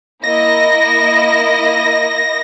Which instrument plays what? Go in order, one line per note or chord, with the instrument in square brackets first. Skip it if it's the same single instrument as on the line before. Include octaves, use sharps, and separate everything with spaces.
[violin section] A#3 E4 D#5 [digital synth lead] A#6